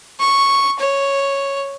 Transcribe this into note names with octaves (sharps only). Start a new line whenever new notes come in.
C#6
C#5